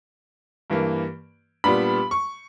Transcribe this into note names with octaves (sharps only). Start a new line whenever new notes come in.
G2 E3 A#3
A#2 G3 B3 D4 B5
C#6